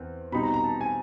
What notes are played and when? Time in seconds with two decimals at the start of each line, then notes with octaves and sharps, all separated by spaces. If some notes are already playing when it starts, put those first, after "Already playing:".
Already playing: E2 C4
0.32 B2 G3 C4 D#4 B5
0.43 A#5
0.54 A#5
0.64 A5
0.81 G#5